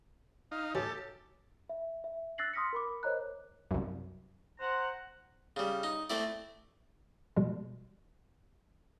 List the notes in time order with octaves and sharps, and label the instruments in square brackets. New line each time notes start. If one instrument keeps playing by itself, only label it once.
[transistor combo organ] D#4 [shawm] F5
[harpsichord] A1 B2 G#5 [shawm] G4 [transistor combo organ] A4 [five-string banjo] C#5
[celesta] E5
E5
E6 F#6 A6 A#6 C7 F#7
C6 D#6 F6 A#6 B6 C#7
A#4 B5 D6
A#4 C5 C#5 D#5 A#5 F#6
[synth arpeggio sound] C2 F#2
[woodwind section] C5 F#5 A#5
[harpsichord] C#3 G3
D#4
A3 C4 E4 D5
[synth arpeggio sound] B2 F3 G3 G#3